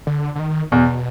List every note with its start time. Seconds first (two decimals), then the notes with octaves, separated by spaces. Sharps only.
0.07 D3
0.36 D3
0.39 D#3
0.72 E2 B2